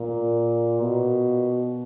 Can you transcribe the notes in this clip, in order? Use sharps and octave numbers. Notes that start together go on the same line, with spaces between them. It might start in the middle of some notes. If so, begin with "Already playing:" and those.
Already playing: A#2
B2